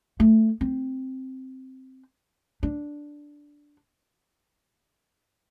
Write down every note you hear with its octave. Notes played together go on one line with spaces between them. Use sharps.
A3
C4
D4